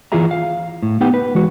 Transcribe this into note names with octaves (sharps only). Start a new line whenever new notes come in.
E3 E4 F4 G#4 E5 A#5
F5
A2
B3 D#4 G4 B4 F#5 G5
B4
E3 G#3 F#4